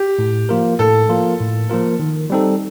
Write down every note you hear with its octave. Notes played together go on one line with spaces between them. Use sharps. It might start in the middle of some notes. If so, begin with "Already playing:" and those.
Already playing: G4
A2
F3 A#3 F4 A#4
A2 A4
F3 A#3 F4 A#4
A2
F3 A#3 F4 A#4
D#3
G3 C4 D#4 A4